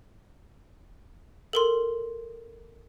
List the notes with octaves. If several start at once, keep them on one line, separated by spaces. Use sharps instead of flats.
A4 A#4 C6